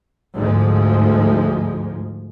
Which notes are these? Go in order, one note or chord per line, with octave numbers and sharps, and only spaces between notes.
D2 G#2 F3 G#3